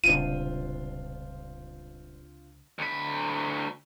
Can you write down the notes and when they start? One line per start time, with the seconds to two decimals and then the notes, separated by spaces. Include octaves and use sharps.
0.04 D#1 C#2 C3 C4 D4 F4 D#7
2.79 D2 B5